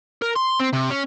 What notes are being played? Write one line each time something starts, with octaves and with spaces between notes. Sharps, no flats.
A#4
C6
C4
C3
C#4